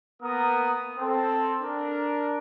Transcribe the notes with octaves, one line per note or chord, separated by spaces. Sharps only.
A#3 B3 A#4 F#5 A#5 D#6
C4 A4
D4 A#4